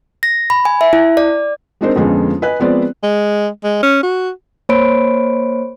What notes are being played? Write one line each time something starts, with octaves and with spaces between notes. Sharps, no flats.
A#6
B5
G#5
E5
E4
D5
G#3 C4 D4 D#4 A#4 C5
F2 D3 F3 G#3 B3 C#4
B4 D#5 G#5 F#6
F3 G#3 B3 C4 C5 D5
G#3
G#3
C#4
F#4
A#3 C5 C#5 B5 D7